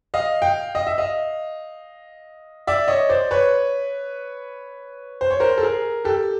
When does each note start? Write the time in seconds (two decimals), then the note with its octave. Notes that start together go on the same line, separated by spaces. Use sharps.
0.14 D#5 F5
0.42 F5 G5
0.75 D#5
0.87 E5
0.98 D#5 F5
2.67 D5 E5
2.88 C#5 D#5
3.09 C5 D5
3.31 B4 C#5
5.21 C5
5.31 C#5
5.40 A#4 C5
5.58 A4
5.63 G#4 A#4
6.05 G4 A4